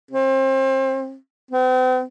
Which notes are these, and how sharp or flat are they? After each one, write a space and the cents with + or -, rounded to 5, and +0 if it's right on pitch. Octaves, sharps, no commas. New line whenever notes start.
C4 +30
C4 -45